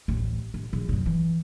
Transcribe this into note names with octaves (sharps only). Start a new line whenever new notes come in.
A1 D2
A1
A#1
F#2 A#2
E3